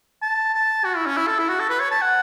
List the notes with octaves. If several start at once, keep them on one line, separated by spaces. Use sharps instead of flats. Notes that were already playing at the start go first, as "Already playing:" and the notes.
A5
A5
F#4
E4
C#4
E4
A4
E4
F#4
A4
B4
C#5
A5
F#5